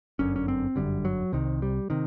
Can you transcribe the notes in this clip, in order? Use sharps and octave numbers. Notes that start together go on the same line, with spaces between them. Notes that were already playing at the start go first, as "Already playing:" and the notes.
G1 F#2 D3 C#4
C#4
C4
G1 F#2 D3 G3
F#3
C2 C3 D#3
G3
C3 D#3